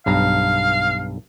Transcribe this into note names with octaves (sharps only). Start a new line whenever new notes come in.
B1 G2 F5 A#5